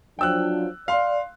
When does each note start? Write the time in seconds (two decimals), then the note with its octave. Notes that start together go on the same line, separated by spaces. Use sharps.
0.19 F3 F#3 D4 G5 E6 F#6
0.88 D5 F5 C6